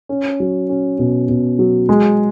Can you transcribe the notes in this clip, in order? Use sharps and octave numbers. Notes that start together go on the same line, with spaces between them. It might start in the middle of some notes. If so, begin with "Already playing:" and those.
C#4
F#3
C#4
B2
B2
F#3
G#3